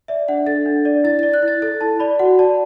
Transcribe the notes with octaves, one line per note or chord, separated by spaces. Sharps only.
D5 E5
D4 F#5
A4 A6
D4
D5
E4 A6
D5 A6
F#6
E4
A6
A4 A6
E4 A5
D5 B5
F#4 F#5
D5 A5